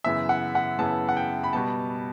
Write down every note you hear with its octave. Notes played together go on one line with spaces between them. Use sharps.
F#2 C#3 E3 B3 E5
F#5
F#5
F#2 C#3 E3 B3 A5
F#5
G5
B5
B2 G3 B3 A5